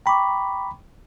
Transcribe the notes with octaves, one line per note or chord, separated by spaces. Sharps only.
G5 A#5 B5 C#6 D6